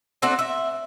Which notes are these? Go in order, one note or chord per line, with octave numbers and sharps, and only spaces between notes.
A3 C4 D4 F#4
E5